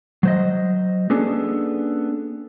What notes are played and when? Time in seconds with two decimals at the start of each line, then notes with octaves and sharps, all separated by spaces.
0.23 F#3 C5 D#5
1.10 A#3 B3 C#4 D4 G#4 A4